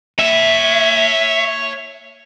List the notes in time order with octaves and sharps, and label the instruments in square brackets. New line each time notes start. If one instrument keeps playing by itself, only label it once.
[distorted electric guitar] C#5 A5 [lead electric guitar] E5